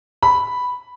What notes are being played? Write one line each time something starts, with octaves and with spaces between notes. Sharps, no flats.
B5